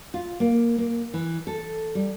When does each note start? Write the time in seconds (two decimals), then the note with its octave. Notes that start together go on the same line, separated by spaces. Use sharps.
0.14 F4
0.40 A#3
0.78 A#3
1.14 E3
1.47 A4
1.95 G3